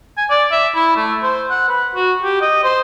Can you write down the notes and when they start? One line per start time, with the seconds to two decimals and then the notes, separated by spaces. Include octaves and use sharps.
0.18 G#5
0.30 D5
0.52 E5
0.76 E4
0.97 A3
1.23 C5
1.50 F#5
1.69 B4
1.95 F#4
2.24 G4
2.42 D#5
2.64 C5